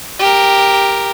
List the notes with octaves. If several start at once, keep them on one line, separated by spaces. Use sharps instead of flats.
G4 A#4